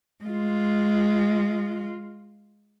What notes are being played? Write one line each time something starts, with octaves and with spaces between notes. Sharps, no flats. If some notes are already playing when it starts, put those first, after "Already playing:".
G#3 F4